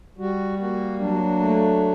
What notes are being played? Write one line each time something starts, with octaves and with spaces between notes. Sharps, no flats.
G3 F#4
A#3 F#4
F#3 D4
A3